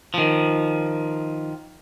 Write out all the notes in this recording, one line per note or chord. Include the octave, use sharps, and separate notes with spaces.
D#3 F3